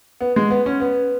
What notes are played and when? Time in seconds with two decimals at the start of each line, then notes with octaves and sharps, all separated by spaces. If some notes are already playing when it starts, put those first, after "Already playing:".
0.21 B3
0.36 G#3
0.50 B3
0.66 C#4
0.80 B3